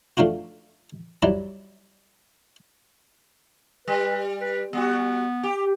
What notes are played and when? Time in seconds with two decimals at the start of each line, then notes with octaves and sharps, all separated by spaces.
0.17 F3 A3 D4 F4 F#4
1.22 F#3 G3 E4 D5
3.88 G3 B4
4.41 B4
4.73 G3 B3 F#4
5.43 G4